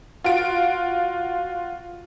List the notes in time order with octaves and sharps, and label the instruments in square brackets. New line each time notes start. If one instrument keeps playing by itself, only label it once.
[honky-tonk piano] F4 F#4 D7